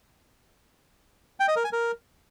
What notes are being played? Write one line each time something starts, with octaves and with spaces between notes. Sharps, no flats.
G5
D#5
A#4
G#5
A#4